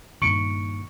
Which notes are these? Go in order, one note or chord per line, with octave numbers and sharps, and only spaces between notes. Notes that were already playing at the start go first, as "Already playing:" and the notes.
G2 A#2 D#3 C#6 C#7 D7